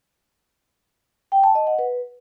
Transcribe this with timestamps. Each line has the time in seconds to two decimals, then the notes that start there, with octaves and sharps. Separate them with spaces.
1.32 G5
1.44 A5
1.55 D#5
1.67 F#5
1.79 B4